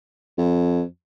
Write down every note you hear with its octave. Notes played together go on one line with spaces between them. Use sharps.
F2